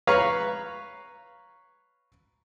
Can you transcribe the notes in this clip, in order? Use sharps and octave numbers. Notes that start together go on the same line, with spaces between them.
B4 C#5 F5 A#5 B5 C#6